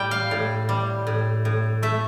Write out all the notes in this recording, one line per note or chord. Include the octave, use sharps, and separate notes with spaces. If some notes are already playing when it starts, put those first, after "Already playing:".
Already playing: A2 G3 G5
F5
A2
G3
A2
A2
A3 E5